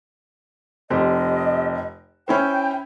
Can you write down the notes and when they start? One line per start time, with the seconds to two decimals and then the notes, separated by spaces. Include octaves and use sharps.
0.90 F1 C4 G4 D#5
2.28 C#4 E4 C5 G5